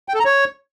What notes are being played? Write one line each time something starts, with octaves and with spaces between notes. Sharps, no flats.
G5
A4
A#5
C#5